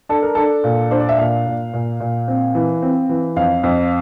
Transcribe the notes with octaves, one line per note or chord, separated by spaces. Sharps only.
D4 A4
A#4
D4 A4
A#2
D4 C5
D5
E5
A#2 F5
A#2
A#2
A#2
C4
E3
C4
E3
F2 F5
F2